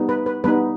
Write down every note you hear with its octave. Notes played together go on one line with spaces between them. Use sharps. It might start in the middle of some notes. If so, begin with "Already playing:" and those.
Already playing: G3 B3 D#4
B4
B4
G3 B3 D#4 B4